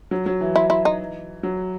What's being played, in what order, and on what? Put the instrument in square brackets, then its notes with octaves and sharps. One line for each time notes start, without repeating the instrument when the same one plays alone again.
[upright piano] F#3
F#3
E3
[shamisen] E4
E4
D#4
[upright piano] F#3